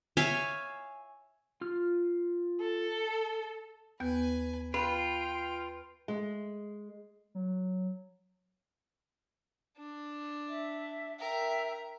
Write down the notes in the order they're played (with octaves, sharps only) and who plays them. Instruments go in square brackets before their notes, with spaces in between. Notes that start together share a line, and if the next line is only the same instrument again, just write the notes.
[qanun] C#5 E5 F5 G#5
[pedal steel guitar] F4 F6
[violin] A4
[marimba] D#2 B3 G6 [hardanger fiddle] B4 G#5
[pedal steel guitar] F4 [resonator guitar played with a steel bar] B4 [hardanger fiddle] G5
[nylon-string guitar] G#3
[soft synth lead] F#3
[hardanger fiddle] D4
[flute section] E5
[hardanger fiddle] A#4 [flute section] E5 G5